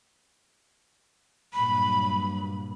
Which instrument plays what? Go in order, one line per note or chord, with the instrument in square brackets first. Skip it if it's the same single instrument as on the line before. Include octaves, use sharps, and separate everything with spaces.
[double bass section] G2 A#2 F#3 [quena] B5